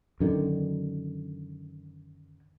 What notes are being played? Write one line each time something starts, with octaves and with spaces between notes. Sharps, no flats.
F#2 D3 D#3